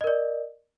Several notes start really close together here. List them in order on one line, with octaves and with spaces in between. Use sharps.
D#5 A#4 D5